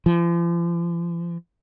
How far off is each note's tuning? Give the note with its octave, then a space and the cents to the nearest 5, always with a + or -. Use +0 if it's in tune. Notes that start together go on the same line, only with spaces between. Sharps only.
F3 -40